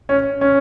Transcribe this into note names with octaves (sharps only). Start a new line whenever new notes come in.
C#4
C#4